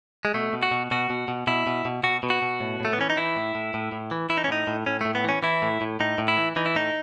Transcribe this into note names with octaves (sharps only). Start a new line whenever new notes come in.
G#3
B2 A3
B2
F#4
B2
B2 F#4
B2
B2
B2 E4
B2
B2
B2 F#4
B2
F#4
B2
A2
A2 A3
B3
E3 C#4
D#4
E3 E4
A2
A2
A2
A2
E3
E3 E4
D#4
C#4
A2 D#4
A2
A2 C#4
A2 A3
B3
E3 C#4
E3 E4
A2
A2
A2 D#4
A2
E4
E3
E3 D#4
E4
A2 D#4